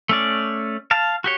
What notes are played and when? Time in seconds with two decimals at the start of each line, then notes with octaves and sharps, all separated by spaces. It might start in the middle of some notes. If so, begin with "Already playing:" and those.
0.09 A3 C#4 D5
0.91 F5 A5
1.24 F#4 G4 C#5